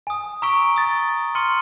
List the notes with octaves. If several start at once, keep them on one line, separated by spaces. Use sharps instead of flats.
G#5 D#6
A#5 C#6 E6 B6 D7 G7
D#6 A6
C6 F6 C#7 D#7 G7